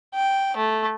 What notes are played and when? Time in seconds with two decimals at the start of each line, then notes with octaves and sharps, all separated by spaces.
0.14 G5
0.56 A3